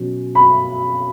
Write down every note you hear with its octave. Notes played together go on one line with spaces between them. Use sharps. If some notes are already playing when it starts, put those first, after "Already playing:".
Already playing: B2 F#3 C#4
B5